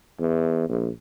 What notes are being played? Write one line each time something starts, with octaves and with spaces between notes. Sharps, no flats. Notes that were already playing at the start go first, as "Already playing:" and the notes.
E2
A#1